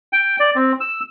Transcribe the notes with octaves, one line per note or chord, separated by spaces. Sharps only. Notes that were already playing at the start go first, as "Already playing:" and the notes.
G5
D5
C4
E6